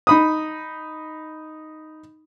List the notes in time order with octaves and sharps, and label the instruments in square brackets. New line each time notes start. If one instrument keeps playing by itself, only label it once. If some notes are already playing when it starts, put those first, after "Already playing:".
[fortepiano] D#4 B5 D#6